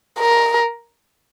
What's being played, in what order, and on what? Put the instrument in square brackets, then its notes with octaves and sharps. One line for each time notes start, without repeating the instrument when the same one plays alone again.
[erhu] A#4